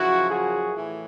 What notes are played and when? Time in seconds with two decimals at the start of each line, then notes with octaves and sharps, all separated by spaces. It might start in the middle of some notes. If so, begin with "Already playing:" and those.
Already playing: F#2 C#3 F3 E4 F#4
0.30 F#4 G#4
0.75 A2 E3